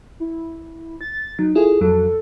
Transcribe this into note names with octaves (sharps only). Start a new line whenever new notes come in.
E4
A6
F#3 D#4
E4 F4 G#4 A4
F2 F#3 A4